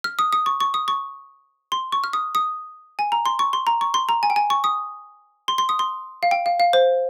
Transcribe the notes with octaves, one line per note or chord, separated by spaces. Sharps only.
F6
D#6
D#6
C#6
C#6
D#6
C#6
C6
C#6
F6
D#6
D#6
G#5
A#5
C6
C#6
C6
A#5
C#6
C6
A#5
G#5
G5
G#5
C#6
D#6
C6
C6
D#6
C6
F5
G5
F5
F5
C5